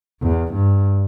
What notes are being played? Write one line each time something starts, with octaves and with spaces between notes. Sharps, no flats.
E2
G2